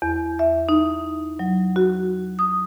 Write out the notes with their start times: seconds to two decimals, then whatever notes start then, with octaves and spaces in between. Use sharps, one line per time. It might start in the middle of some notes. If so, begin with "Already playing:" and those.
0.02 E2
0.39 E5
0.69 D#4
1.39 F#3
1.76 F#4
2.39 D#6